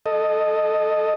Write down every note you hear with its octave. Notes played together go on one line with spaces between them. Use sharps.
A4 D#5